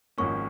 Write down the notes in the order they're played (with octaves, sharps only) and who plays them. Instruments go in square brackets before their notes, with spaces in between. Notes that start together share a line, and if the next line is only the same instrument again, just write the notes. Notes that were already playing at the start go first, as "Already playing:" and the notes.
[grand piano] G#1 G#2 F3 A#3 C#4 [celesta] C#6